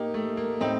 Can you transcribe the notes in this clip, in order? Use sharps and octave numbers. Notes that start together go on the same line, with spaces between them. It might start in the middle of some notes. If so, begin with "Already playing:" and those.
Already playing: A2 A#3 D#4 G4
A3
A#3
A2 C4 D#4